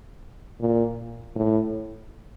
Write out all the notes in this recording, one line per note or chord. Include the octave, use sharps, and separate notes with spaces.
A#2
A2